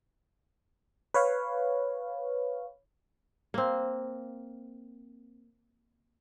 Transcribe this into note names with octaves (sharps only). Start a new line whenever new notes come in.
B4 C#5 F5
A#3 C4